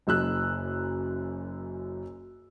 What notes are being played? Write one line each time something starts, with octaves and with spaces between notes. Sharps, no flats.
F#1 F#2 E6 F#6